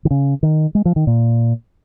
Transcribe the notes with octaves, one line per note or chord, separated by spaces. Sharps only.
D#3
C#3
D#3
G#3
F3
D#3
A#2